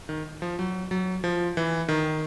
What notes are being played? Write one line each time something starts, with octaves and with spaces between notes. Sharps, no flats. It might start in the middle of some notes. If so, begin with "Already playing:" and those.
D#3
F3
F#3
F#3
F3
E3
D#3